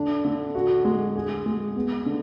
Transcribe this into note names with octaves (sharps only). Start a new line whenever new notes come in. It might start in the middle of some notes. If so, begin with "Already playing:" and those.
Already playing: D3 D4
D3
F#4
G#3
G#4
G#3
B3
D3